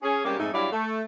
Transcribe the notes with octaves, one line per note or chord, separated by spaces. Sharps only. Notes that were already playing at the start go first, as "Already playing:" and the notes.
C#4 G#4
C3 G3 G#3 A#3 C#4 G4
F2 G#2 A3 D#4
G2 F#3 G3 E4 D5 F5
A3